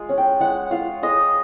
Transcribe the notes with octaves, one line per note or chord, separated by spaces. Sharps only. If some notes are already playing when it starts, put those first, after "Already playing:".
Already playing: G#3 F4
C#4
G5
G#3 F#5
F4 F5
G#3 D#5